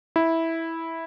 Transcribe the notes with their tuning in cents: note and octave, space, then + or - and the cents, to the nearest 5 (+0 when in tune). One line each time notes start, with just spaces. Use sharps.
E4 -10